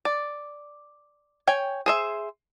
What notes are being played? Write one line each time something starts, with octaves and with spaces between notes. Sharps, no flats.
D5
C#5 G5 G#5
G#4 C5 E5